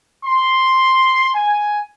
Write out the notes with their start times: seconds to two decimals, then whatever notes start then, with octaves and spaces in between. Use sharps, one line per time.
0.25 C6
1.34 G#5